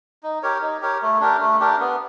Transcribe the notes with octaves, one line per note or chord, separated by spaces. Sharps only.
D#4
G4 A#4 C#5
D#4
G4 A#4 C#5
A3
D4 G4 A#4
A3
D4 G4 A#4
B3